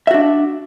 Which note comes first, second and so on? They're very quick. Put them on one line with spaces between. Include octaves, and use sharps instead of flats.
E5 F#4 D4